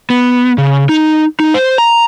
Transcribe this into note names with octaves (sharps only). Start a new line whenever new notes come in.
B3
C#3
D#4
D#4
C5
A#5